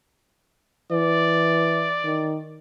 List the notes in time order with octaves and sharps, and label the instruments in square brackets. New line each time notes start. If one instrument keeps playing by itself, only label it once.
[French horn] E3 [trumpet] D5
[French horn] D#3